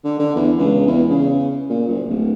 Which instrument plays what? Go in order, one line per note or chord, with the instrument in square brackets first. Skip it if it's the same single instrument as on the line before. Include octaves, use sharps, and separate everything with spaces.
[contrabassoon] D3
D3
E2
C#2
E2
C#3
A#2
F#1
D1